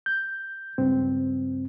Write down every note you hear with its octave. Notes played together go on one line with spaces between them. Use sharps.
G6
C#2 G2 C4